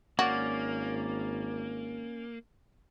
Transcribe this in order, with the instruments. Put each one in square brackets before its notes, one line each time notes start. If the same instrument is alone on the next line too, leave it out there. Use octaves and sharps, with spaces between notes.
[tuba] G#1 [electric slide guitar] A#3 [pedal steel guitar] C#4 D5 [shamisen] F#4